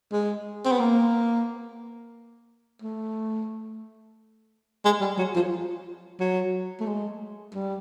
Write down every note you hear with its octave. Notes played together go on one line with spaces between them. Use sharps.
G#3
C4
B3
A#3
A3
G#3
G3
F#3
F3
F#3
A3
G#3
G3